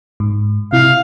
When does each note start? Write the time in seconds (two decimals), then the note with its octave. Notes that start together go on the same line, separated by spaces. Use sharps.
0.20 G#2
0.73 C3 E4 F5